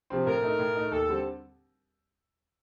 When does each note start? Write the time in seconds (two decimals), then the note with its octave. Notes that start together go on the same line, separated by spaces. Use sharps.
0.10 C3 F3 C4
0.26 A2 A#4
0.43 A3 D#4
0.59 A2
0.75 A3 D#4
0.92 D#2 A4
1.08 D3 G3 C4